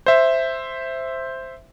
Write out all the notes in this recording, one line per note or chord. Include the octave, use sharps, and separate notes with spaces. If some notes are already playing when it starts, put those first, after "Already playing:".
C5 E5